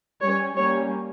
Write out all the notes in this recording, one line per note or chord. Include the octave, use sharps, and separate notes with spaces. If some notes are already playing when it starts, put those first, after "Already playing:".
G3 C#4 C#5
G3 A#3 C#4 C#5